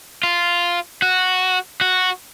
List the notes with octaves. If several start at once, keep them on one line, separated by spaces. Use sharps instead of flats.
F4
F#4
F#4